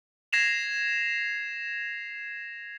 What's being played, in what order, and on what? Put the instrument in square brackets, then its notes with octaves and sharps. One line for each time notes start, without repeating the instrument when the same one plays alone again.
[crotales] G#6 A#6 C7 E7 F7